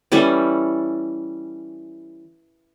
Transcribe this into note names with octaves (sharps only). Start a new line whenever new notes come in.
E3 G3 C#4 A4